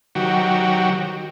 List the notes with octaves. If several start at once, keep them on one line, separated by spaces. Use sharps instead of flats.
D#3 F#3 F#4 G4